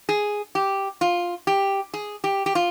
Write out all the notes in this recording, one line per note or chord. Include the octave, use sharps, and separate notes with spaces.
G#4
G4
F4
G4
G#4
G4
G4
F4